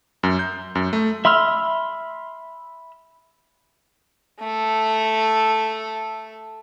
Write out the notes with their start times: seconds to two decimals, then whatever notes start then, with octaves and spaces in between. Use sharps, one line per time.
0.23 F#2
0.39 G6
0.75 F#2
0.93 A3
1.25 E5 B5 C6 E6 F6
4.40 A3 A4